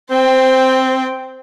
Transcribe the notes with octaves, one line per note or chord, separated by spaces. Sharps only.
C4 C5 G5